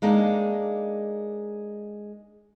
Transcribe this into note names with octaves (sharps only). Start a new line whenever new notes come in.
G#3 A#3 D4 D#4